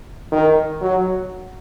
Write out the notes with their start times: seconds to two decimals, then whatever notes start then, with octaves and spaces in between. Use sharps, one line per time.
0.32 D#3
0.81 F#3